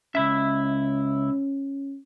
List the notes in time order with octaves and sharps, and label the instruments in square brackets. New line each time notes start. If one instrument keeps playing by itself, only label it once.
[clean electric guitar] C#2 E4 E5 [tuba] C#4